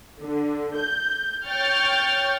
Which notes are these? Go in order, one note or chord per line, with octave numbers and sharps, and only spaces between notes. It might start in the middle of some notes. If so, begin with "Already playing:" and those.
D3
G6
C#5 G5 C#6 F6 G6 A6